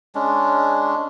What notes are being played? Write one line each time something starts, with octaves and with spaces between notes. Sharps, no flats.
G#3 C#4 D4